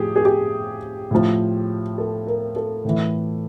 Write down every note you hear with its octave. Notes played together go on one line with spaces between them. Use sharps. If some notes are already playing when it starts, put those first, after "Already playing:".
Already playing: A2 F3 G4 G#4
G#4
G4
A2 F3
A4
A#4
A4
A2 E3